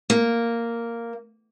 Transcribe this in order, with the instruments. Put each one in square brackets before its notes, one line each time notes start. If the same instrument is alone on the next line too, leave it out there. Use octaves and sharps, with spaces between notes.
[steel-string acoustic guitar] A#3